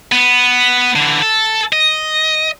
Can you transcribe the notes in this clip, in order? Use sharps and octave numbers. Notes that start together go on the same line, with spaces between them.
B3
D3 E3
A4
D#5